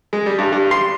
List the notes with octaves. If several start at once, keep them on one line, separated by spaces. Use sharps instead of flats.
G#3
G3
G2
G2
C6